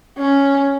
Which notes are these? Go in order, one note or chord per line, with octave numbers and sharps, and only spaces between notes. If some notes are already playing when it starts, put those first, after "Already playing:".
C#4